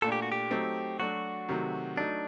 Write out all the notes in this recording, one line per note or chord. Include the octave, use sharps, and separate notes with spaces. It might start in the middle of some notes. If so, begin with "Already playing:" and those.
A#2 A3 D4 A4
G4
F#4
G4
F#3 A3 C4 D#4
F#3 A3 D4 F#4
C3 D#3 F#3 A3
F#3 A3 D4 D#4